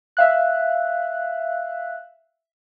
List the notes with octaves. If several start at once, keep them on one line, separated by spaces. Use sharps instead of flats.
E5 F5 F#6